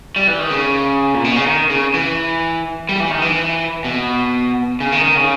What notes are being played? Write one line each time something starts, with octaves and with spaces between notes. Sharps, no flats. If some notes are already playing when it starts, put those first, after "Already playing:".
G3
E3
D#3
C#3
A#2
B2
C#3
D#3
C#3
E3
G3
E3
D#3
E3
B2
C#3
D#3
D#3
C#3